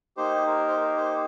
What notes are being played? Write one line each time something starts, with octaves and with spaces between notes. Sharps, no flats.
A#3 D#4 G4 C5
A#4
C5
A#4
C5